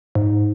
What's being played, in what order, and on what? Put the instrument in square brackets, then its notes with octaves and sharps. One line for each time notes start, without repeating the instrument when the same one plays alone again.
[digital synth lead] G#2